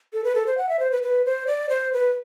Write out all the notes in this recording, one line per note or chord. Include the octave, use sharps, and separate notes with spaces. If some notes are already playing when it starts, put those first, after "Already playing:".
A4
B4
A4
C5
F#5
E5
C5
B4
B4
C5
D5
C5
B4